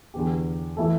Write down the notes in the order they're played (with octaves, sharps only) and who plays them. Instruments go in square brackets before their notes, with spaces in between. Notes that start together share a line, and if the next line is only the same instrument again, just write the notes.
[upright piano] E2 D3 B3 G4
E3 A3 E4 A4